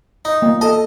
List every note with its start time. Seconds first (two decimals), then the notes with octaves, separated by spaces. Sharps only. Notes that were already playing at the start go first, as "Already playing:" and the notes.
0.25 D#4
0.42 A#3
0.61 A4 D#5 A5